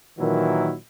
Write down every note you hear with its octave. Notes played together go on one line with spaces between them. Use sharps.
A#2 D#3 E3 F#3 E4